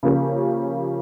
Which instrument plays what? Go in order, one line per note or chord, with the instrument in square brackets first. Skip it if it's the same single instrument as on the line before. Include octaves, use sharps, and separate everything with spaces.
[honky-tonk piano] C#3 F3 A#3 C#4 G4